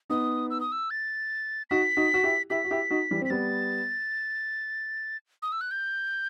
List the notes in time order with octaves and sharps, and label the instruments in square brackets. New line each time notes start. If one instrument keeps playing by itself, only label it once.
[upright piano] B3 D#4 [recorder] D#6
[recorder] E6
D#6
E6
A6
[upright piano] D#4 F#4 [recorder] B6
[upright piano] D#4 F#4
F#4
E4 G4
[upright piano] E4 G4 [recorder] B6
[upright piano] F#4
E4 G4
D#4 F#4
E3 G3
[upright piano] C4 [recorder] B6
[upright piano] G3 B3 [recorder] A6
[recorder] D#6
E6
F#6
G6